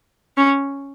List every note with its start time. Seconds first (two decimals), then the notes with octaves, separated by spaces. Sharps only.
0.37 C#4